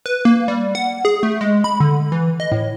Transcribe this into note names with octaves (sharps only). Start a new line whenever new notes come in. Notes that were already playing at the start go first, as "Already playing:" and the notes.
B4
A#3
G3
F#5
G#4
A3
G#3
B5
D3
E3
D#5
A2